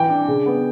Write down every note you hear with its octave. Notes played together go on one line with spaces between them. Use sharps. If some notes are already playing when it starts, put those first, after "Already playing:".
Already playing: E3 G5
D4
C#3
B3